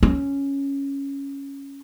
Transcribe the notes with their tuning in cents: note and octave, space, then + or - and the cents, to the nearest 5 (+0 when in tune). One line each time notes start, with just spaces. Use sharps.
C#4 +0